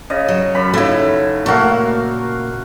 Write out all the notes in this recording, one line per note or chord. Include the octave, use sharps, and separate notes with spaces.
C#3 D#5
F#3 C#5
F#2 B5
C#3 A3 D#4 E4
A#2 A3 F#4 A#4 F5